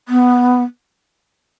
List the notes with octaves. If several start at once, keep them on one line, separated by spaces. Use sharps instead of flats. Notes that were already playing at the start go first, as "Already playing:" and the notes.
B3